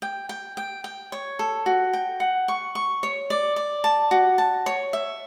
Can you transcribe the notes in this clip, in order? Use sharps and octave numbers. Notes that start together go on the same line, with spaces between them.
G5
G5
G5
G5
C#5
A4
F#4
G5
F#5
C#6
C#6
C#5
D5
D5
A5
F#4
A5
C#5
E5